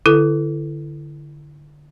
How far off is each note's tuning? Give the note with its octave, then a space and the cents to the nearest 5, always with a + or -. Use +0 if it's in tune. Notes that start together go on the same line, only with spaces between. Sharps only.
D3 +0 E4 +15 A4 +0